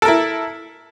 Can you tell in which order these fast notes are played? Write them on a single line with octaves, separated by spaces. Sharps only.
A4 A#4 E4